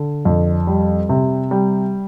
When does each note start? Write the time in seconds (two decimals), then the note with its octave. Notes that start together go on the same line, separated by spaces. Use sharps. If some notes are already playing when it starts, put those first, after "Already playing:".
Already playing: D3
0.25 F2
0.67 G3
1.09 C3
1.51 G3